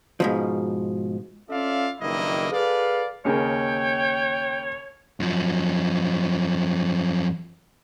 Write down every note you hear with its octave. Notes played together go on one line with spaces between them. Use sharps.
G#2 B2 F3
C#4 F4 A4 D5 E5 F5
F#1 G2 D#3 A#3 E4 D#5
G#4 A4 B4 D5 F5
D#2 C#3 A#3 C#5 G5
F#2 F3